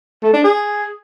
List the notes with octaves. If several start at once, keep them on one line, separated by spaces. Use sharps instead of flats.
A3
D4
G#4